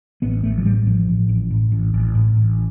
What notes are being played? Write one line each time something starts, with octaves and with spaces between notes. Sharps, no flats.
A1 B3
A1 A3
F3
A2 G3
A1 F3
A2
A1
A2
A1
A1
A2
A1